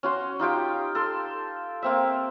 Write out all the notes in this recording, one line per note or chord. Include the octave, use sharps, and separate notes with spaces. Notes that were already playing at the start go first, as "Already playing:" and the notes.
C#4 F#4 C6
D#4 F4 G4 G5
A4 C6
A#3 C4 E5